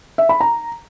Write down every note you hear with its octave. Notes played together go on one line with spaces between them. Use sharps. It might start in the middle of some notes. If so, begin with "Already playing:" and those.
E5
B5
A#5